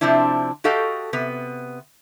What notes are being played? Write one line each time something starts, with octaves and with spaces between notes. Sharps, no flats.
C3 F3 C4 D4 E4
F#4 G4 A4 D#5 F5 G5
C3 B3